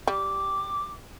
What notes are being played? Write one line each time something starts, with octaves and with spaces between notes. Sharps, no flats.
G3 D6